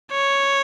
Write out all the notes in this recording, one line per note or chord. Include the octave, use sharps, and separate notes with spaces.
C#5